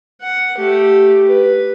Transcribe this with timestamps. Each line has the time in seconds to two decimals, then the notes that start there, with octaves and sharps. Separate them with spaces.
0.21 F#5
0.57 A3 G4
1.27 B4